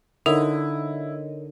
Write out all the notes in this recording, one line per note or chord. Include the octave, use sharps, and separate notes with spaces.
D3 D#4 E4 A#4 C#5 D#5